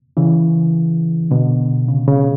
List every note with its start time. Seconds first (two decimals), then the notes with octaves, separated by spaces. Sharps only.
0.17 C#3 E3
1.31 B2 D3
1.88 C#3
2.08 C#3